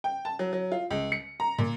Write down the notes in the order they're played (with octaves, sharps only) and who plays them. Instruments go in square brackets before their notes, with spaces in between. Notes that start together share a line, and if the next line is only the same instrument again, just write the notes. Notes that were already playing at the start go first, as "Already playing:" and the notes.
[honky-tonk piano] G5
A5
F#3
F#3
F4
C#2
C#7
A#5
A#2